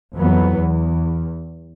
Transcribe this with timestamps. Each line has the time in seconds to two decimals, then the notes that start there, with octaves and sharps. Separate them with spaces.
0.17 F2 E3 F#3 B3
0.58 E2